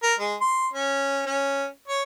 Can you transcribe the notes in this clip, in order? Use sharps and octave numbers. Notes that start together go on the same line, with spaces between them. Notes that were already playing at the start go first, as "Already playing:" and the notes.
A#4
G#3
C6
C#4
C#4
C#5